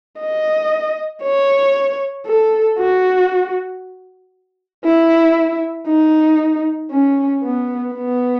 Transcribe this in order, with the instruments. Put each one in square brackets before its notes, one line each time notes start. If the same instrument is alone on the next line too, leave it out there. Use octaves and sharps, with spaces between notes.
[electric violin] D#5
C#5
A4
F#4
E4
D#4
C#4
B3
B3